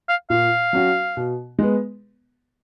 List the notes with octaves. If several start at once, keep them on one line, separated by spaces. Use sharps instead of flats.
F5
A#2 F5
F#3 C#4 F#4
B2
G#3 B3